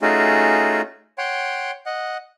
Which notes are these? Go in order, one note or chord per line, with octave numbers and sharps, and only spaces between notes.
A3 C#4 D#4 F4 F#4 G#4
C#5 F#5 G5 C6
D#5 F#5